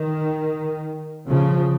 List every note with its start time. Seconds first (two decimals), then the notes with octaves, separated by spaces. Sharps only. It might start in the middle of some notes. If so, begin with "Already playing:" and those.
Already playing: D#3
1.28 C#3 F3